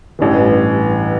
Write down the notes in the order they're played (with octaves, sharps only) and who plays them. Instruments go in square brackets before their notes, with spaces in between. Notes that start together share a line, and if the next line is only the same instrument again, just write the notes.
[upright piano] A1 G2 E3